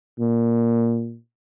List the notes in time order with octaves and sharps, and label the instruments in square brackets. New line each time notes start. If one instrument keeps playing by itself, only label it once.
[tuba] A#2